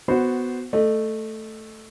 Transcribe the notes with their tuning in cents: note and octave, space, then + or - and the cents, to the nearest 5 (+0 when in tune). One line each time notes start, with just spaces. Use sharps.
B3 +10 F#4 +0 C5 +0
A3 +0 D#5 -25